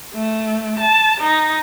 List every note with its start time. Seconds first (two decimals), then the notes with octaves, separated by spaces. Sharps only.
0.14 A3
0.79 A5
1.20 D#4